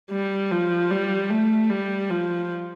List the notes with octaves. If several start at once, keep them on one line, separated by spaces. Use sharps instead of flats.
G3
F3
G3
A3
G3
F3